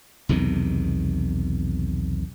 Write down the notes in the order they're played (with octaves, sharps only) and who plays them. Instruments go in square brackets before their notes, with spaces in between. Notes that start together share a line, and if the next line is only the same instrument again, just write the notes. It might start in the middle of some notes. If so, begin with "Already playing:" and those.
[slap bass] B1 E2 C3 D#3